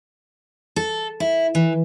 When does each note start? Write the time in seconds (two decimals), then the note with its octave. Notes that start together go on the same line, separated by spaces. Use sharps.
0.76 A4
1.20 E4
1.55 E3